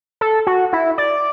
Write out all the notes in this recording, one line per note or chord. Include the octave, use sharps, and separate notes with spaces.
A4
F#4
E4
D5